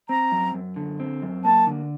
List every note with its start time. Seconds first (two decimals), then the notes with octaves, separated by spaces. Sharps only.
0.09 C4 A#5
0.32 F#2
0.54 F#2
0.76 D3
1.00 C4
1.22 F#2
1.44 A#3 A5
1.67 D3